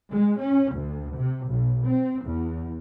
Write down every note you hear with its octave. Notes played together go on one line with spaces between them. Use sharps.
G#3
C#4
D2
C3
B1
C4
E2